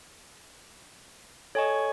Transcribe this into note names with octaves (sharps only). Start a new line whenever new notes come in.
A4 C#5 D#5 G#5 C#6